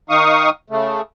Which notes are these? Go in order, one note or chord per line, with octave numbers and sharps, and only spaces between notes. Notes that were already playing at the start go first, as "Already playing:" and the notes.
D#3 D#4 F5 C#6 D#6
C#3 A3